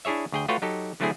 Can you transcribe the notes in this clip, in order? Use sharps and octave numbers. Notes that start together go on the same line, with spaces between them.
D4 E4 G#4 C#5 E5
D2 G#4 G5
A3 F4 F#4 B4 C#5 G5
F#3 D#4 G4 A4
D3 F#3 A3 C4 E4 G#4